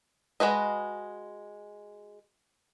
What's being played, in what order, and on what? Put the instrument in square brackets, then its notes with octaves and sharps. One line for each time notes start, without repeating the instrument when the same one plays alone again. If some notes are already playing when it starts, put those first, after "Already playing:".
[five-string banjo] G#3 F#4 B4 D#5